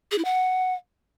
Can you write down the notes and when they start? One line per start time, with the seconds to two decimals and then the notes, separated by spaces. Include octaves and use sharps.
0.11 G#4
0.18 E4
0.25 F#5